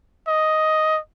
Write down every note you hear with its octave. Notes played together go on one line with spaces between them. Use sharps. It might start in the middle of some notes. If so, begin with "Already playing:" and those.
D#5